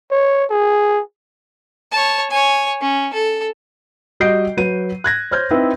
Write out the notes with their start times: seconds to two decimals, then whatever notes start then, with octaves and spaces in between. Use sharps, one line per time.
0.11 C#5
0.50 G#4
1.92 C#5 A5
2.31 C#5 G#5
2.82 C#4
3.14 A4
4.20 G3 F#4 D#5 G6 C7 D7
4.57 F#3 B4 D#7
5.04 F#6 G#6 A#6
5.31 C5 C#5 F6 G6 G#6
5.51 C4 D#4 E4 B4 E5